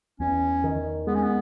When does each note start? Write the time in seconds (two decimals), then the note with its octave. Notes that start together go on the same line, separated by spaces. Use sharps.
0.20 E2 C#4
0.64 D#3
1.07 G#3 B3
1.15 C#4
1.23 B3